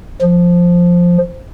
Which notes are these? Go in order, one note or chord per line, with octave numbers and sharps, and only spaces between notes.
F3